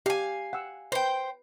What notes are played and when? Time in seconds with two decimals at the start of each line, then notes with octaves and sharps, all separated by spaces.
0.06 G4 F5 G#5
0.53 F#5 G5 E6
0.92 B4 C5 G5